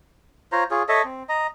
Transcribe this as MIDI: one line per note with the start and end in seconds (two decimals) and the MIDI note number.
0.52 0.64 65
0.52 0.64 72
0.52 0.64 73
0.52 0.64 82
0.71 0.83 65
0.71 0.83 68
0.71 0.83 73
0.89 1.02 69
0.89 1.02 73
0.89 1.02 75
0.89 1.02 76
1.04 1.23 60
1.29 1.47 75
1.29 1.47 82